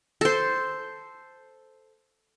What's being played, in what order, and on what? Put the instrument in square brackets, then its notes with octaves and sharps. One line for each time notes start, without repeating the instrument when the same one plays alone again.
[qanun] A4 C5